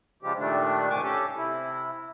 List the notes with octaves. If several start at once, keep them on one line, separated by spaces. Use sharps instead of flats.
C#3 F3 G3 G#3 G4
A#2 D#3 G3 A3 D4
D#2 G#2 C3 G#5 C#6 D6
C#4 G4 A4
C3 E4